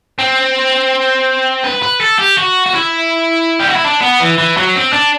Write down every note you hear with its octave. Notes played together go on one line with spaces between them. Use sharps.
C4
B4
B4
A4
G4
F#4
F#4
E4
G4
F#4
E4
D4
B3
E3
E3
F#3
C4
D4